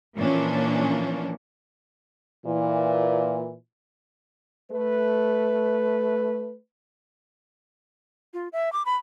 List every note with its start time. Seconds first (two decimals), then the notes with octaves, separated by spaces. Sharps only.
0.16 A#2 E3 F3 A#3 C#4 D4
2.47 A#2 E3
4.72 A3 B4
8.34 F4
8.53 E5
8.73 D6
8.86 B5